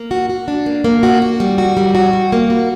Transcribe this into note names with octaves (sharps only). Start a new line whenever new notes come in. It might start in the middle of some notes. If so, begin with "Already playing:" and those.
Already playing: A#3
F#4
F#4
D4
A#3
A#3
F#4
F#4
G3
F#4
G3
F#4
G3
A#3
F#4